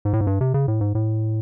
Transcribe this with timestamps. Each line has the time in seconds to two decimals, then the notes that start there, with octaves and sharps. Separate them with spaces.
0.05 G#2
0.13 A2
0.21 G#2
0.27 G2
0.41 C3
0.54 C#3
0.68 A2
0.81 G#2
0.95 A2